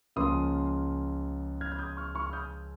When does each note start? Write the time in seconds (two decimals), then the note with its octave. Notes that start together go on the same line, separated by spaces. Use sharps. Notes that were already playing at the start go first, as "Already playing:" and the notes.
0.16 C#2 C#3 F3 A#3 C6 D#6
1.61 F6 G#6
1.72 G#6
1.79 D#6 G6
1.97 C#6 F6
2.15 C#6 F6
2.27 F6
2.33 D#6 G6